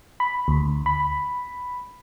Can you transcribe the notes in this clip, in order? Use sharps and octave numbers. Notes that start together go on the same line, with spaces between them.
B5
D2
B5